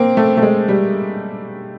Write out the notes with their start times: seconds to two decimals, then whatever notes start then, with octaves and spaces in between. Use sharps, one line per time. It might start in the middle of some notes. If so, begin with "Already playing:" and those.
Already playing: A#3 C4
0.17 A3
0.37 A3
0.42 G#3
0.68 G3